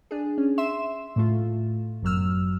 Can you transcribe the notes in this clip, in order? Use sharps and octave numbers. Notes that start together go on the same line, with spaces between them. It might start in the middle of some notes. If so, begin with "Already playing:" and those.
D4 G#4
C#4
E5 C6 E7
A2 A3 F4
G1 F#2 F#3 E6 F6